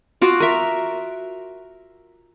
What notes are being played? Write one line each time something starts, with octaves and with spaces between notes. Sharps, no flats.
F4 F#4 D6
A#4 E5